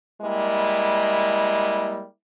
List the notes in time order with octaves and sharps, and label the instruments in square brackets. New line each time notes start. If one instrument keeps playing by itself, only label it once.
[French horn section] G3 G#3 A#3 E4